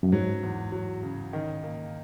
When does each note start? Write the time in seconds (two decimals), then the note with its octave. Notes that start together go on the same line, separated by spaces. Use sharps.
0.03 F#2
0.12 G#2 F#3
0.43 E2
0.72 F#3
1.02 C#3
1.33 D#3
1.64 A#3